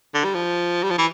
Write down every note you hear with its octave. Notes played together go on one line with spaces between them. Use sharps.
D3
G3
F3
G3
F3
E3